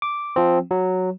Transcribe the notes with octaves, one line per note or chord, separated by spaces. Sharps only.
D6
F3 C4
F#3